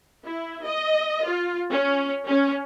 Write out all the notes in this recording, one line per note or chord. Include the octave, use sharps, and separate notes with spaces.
E4
D#5
F4
C#4
C#4